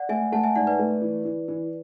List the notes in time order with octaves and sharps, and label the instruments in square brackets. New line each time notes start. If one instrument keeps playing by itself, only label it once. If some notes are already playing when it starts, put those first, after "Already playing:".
Already playing: [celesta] D5 F#5
[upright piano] A3 [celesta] E5 G#5
[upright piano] A3 [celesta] F#5 A5
[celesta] E5 G#5
[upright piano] G#2 [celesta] D5 F#5
[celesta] B4 D5
[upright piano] A3
E3
E3
E3